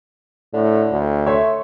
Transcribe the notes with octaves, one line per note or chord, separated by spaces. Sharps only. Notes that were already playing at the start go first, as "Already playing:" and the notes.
A2 D3
D2
A3 C#5 E5 C6